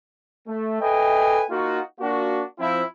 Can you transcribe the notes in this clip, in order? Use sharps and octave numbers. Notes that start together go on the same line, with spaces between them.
A3
A4 B4 D#5 E5 G5 G#5
A#3 D#4 F4 F#4
A#3 D4 F4 F#4
F3 C4 E4